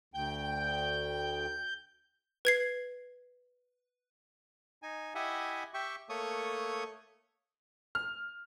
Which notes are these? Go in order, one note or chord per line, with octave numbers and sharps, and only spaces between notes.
D2 G5 G6
B4 G#6 C7
D#4 G#5
E4 G4 D#5 E5 F#5 G#5
G4 E5 G5 C#6
A3 A#3 A4 C#5 C#6 D#6
F6